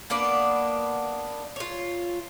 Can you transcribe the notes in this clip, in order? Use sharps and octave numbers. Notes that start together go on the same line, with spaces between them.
A#3 B3 D4 D5
F4 C#5